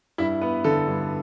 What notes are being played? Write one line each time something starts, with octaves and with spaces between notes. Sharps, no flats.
G2 E4 E5
B3 B4
D3 A4
G2